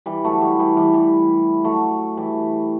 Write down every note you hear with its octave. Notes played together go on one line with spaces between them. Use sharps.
E3 G3
F#3 A3
E3 G3
E3 G3
E3 G3
E3 G3
F#3 A3
E3 G3